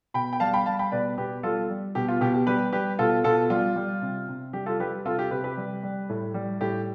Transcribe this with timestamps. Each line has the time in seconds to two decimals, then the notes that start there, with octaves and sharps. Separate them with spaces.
0.14 B2 G5 B5
0.33 G5
0.40 G3 F5 A5
0.53 G5 B5
0.66 G3 F5 A5
0.79 G5 B5
0.92 B2 B4 D5
1.18 B2 G4 B4
1.43 G3 F4 A4
1.70 G3
1.95 B2 G4
2.08 F4
2.21 B2 G4
2.34 G4
2.47 G3 G4 B4
2.73 G3 G4 B4
2.99 B2 F4 A4
3.24 B2 F4 A4
3.50 G3 F4
3.76 G3
4.02 C3
4.28 C3
4.53 G3 G4
4.66 F4 A4
4.80 G3 G4 B4
5.05 C3 F4 A4
5.19 G4
5.31 C3 G4 B4
5.44 G4 B4
5.57 G3
5.83 G3
6.09 A2
6.34 G3
6.61 A2 G4